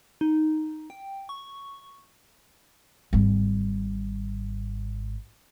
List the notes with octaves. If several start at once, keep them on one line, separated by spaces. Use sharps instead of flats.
D#4
G5
C#6
G#1 G3